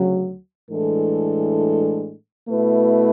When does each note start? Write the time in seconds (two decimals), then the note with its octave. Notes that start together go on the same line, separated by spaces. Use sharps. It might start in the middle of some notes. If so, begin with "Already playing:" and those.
Already playing: D2 C#3 F#3
0.70 A2 E3 G#3 D4 A4
2.49 B2 A3 E4 B4